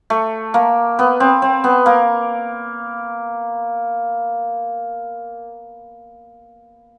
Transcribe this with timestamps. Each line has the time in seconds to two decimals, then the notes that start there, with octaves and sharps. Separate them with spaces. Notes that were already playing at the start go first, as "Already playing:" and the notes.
0.10 A3
0.54 A#3
0.99 B3
1.20 C4
1.42 C4
1.64 B3
1.86 A#3